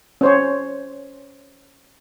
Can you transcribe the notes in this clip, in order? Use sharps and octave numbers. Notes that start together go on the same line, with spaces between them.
C#4 C5 C#5